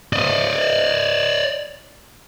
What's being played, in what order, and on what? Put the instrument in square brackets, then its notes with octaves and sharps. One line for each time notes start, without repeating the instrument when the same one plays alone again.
[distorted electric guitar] D5 D#5